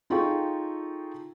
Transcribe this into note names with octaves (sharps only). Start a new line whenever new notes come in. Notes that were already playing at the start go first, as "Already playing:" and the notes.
D#4 F4 G#4 A4 G5 C#6